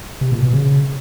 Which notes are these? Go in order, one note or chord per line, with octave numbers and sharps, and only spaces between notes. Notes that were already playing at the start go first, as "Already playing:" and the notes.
C3
A#2
B2
C#3
C#3